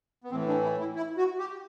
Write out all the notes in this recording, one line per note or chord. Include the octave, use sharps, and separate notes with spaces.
B3
A2 E3 C4
D4
E4
E4
E4
F#4
G4